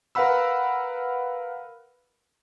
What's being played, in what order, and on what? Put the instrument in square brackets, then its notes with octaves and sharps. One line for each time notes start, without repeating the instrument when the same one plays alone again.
[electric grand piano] A#4 B4 F5 F#5 B5 E6